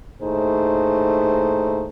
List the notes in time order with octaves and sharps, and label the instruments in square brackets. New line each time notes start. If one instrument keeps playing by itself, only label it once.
[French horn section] D#2 A2 A3 D#4 G#4 C5